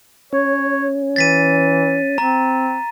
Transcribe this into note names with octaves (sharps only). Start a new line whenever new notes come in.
C#4 C#5
E3 A6 B6 D#7
C4 A#5